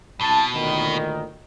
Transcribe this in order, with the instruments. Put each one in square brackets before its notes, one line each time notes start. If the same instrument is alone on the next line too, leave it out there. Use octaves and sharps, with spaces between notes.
[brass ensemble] C2 A5 [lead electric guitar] B2
[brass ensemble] D2 A#2 D#3